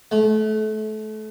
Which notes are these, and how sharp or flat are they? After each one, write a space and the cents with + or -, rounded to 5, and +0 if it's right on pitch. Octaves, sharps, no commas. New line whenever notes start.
A3 -30